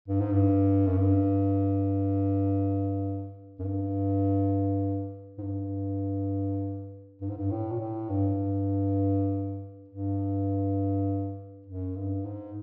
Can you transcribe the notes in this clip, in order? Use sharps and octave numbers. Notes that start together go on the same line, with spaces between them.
G2
G#2
G2
F#2
G2
F#2
G2
G#2
G2
G2
G#2
G2
A2
A#2
A2
G2
G2
F#2
G2
G#2